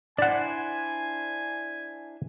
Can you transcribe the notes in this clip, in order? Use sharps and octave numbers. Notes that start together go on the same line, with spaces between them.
D4 E4 C5 D5 F#5 G#5